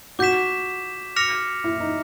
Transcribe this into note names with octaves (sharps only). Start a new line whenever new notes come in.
F#4 D6 G6 B6 E7
D6 F6 A#6 C#7 F7
E4
D#4